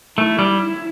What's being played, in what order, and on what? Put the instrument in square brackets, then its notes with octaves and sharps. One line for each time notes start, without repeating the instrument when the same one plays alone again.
[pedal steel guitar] A3 [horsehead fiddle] E4
[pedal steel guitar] G3